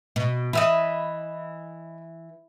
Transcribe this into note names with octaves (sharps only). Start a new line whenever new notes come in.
B2
E3 D#5 E5 B5